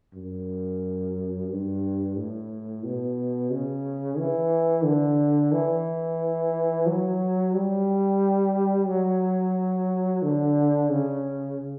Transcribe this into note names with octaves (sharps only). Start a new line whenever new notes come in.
F#2
G2
A2
B2
C#3
E3
D3
E3
F#3
G3
F#3
D3
C#3